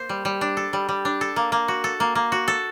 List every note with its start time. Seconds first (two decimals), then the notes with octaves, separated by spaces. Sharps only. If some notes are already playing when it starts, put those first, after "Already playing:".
Already playing: A#3 C5
0.09 G3
0.25 G3
0.41 D4
0.57 A4
0.73 G3
0.89 G3
1.05 D4
1.21 A4
1.36 A#3
1.52 A#3
1.68 F#4
1.84 A4
2.00 A#3
2.15 A#3
2.32 F#4
2.48 A4